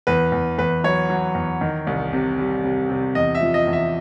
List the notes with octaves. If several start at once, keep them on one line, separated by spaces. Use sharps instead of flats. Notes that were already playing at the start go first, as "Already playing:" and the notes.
E2 B4
E2
E2 B4
F#3 C#5
F#3
E2
D#3
C2
C3
G3
C3
C3
E2 D#5
E5
F3
D#5
E2
E5